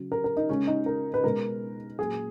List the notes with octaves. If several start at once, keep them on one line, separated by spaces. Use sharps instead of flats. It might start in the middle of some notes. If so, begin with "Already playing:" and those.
Already playing: C#3 F#3
A#4
A#4
D#4
C#3 G#3 C#4
D#4
A#4
B4
B2 G#3 A#4
A#2 F#3 G#4